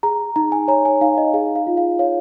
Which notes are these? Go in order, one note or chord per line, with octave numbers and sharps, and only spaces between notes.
G#4 A#5
D#4 A#5
G#5
C#5 A#5
G#5
D#4 F5
D#5
G#4 F5
F5
F4
F5
C#5 F5